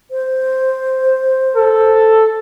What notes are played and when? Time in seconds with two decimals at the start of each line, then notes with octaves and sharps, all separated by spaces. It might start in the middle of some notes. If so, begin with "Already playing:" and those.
0.11 C5
1.56 A4